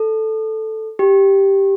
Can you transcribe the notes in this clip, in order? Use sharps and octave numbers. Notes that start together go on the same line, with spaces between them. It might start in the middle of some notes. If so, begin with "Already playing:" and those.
Already playing: A4
G4